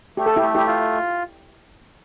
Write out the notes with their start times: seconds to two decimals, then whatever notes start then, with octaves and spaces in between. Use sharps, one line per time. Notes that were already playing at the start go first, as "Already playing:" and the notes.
0.17 A3 G4
0.26 A4
0.36 E4 G4
0.42 A3
0.55 E4 G4
0.67 F4